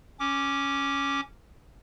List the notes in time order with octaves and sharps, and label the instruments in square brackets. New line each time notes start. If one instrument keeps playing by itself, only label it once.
[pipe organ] C#4 D6